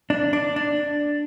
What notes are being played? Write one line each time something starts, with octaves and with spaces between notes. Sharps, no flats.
D4
D4
D4